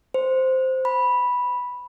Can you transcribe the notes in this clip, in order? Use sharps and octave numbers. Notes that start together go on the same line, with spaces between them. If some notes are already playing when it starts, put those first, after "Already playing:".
C5
B5